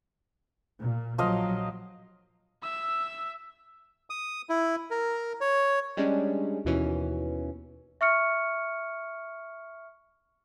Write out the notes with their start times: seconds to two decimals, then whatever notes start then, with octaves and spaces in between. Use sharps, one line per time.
0.79 A#2
1.18 A#1 F3 F#3 D#5 F5
2.63 E5 E6
4.10 D#6
4.49 E4
4.91 A#4
5.41 C#5
5.97 G3 G#3 C#4 D4
6.65 D#2 B2 E3 C#4
8.01 E5 C#6 F6 C#7